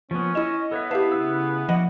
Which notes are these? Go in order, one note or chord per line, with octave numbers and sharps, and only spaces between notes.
F3 A#3 B3 C#4
E4 D#5 C#6 E7
B3 A4 C#5 E5
E4 G4 B4 E5 F5 A5
C#3 D4 E6
F3 A#3 F#4 D5 D#5 F#5